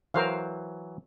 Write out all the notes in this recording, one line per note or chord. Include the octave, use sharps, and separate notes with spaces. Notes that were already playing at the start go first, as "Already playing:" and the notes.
E3 F#3 A#4 C5 F5